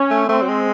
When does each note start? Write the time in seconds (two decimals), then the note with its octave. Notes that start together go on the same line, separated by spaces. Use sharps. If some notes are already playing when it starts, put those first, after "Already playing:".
Already playing: C#4
0.11 A3
0.29 A3 C4
0.42 F#3
0.48 G#3